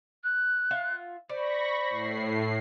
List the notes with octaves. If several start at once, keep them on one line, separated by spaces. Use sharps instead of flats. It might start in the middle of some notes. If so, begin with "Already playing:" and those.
F#6
F4 E5 F#5
C5 D5 B5 C#6 A#6
A2 C7